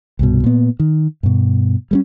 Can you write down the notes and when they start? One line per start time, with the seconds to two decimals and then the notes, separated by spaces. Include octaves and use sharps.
0.19 C2 G2 B2
0.44 A#2 B3
0.80 D#3
1.23 G2 B2
1.91 G3 G#3 C#4